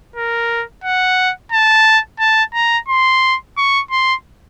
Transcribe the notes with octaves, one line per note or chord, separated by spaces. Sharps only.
A#4
F#5
A5
A5
A#5
C6
C#6
C6